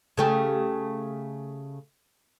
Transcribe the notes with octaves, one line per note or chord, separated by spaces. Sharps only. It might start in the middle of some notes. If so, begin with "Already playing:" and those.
C#3 A3 G4